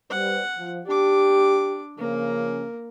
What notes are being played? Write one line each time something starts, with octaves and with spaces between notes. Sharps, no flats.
G3 B4 C5 F#5
F3
D4 G4 D6
C#3 F3 A#3 C#4 A#4